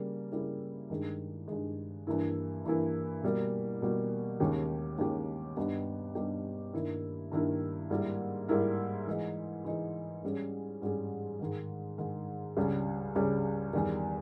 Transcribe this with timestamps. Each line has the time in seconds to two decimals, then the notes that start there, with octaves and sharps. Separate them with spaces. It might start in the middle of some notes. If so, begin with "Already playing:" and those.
Already playing: C#3 G3 A#3
0.32 C#3 G3 A#3 E4
0.90 G2 D#3 G#3
1.48 G2 D#3 G#3
2.07 G2 E3 A#3 E4
2.65 G2 E3 A#3 E4
3.23 B2 G3 A#3
3.82 B2 G3 A#3
4.40 D#2 D#3 G#3 C#4 G4
4.98 D#2 D#3 G#3 C#4 G4
5.57 G2 G3 B3 D#4 G4
6.15 G2 G3 B3 D#4 G4
6.73 G2 D#3 A#3 E4 A#4
7.32 G2 D#3 A#3 E4 A#4
7.90 G#2 G3 A#3 E4 A#4
8.48 G#2 G3 A#3 E4 A#4
9.07 E3 G#3 D#4
9.65 E3 G#3 D#4
10.23 G#2 G3 C#4 G#4
10.82 G#2 G3 C#4 G#4
11.40 G#2 D#3 G#3
11.98 G#2 D#3 G#3
12.57 C#2 C#3 G3 C#4 G#4
13.15 C#2 C#3 G3 C#4 G#4
13.73 E2 D#3 G3